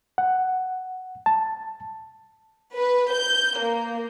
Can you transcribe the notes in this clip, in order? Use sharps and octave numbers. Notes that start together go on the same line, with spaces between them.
F#5
A5
B4
G6
A#3